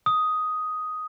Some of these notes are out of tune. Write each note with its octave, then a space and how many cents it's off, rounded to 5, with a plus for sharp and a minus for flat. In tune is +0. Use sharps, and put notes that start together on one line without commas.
D#6 +5